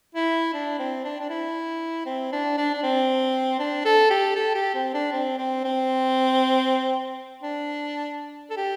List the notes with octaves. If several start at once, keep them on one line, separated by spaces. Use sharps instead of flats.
E4
D4
C4
D4
D4
E4
C4
D4
D4
D4
C4
D4
A4
G4
A4
G4
C4
D4
C4
C4
C4
D4
A4
G4